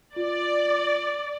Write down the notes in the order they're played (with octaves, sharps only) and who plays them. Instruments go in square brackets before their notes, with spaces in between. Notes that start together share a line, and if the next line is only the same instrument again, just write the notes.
[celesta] F4 [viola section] D5